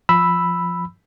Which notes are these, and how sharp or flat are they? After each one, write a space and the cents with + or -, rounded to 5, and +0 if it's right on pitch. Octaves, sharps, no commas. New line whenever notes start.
F3 +0 B5 +0 E6 +0